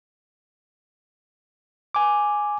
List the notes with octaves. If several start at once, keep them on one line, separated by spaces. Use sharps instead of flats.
G#5 D6